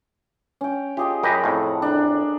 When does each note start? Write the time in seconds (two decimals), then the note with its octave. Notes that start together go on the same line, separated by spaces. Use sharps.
0.61 C#4 G5
0.97 F4 G4 G#4 D#5
1.23 F#2 G4 D#5 F#5 A#5 B5
1.44 F2 A2
1.82 D4 A#4